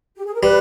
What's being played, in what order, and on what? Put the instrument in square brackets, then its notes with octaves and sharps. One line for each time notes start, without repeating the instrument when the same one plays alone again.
[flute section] G4
G#4
A#4
[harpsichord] G3 [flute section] B4